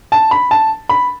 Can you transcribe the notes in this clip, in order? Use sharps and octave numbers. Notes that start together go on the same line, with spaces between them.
A5
B5
A5
B5